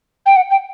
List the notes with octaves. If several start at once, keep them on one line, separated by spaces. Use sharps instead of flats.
G5
F#5
G5